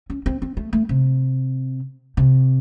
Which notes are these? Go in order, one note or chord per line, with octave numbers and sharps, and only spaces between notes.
C#4
C4
C4
A3
A3
C3
C3